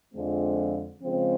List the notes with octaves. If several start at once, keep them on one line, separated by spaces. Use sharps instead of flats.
F2 D3 F3 G#3 C4
C#3 F3 G#3 C4